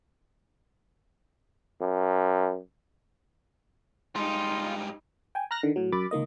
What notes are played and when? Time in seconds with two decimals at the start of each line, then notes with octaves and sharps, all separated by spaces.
1.81 F#2
4.15 G#2 G3 D#4 F4
5.35 G5 G#5
5.51 A#5 F6 F#6 A#6
5.63 D3 D#3
5.76 A2 F#3
5.92 F#2 B5 D6 A6
6.11 C#2 D#3 A#3 D#5